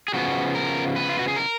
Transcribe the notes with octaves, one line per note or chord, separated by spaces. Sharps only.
G#4
C#3 F3 B3 F#4
A#4
B4
F4
F#4
G#4
A#4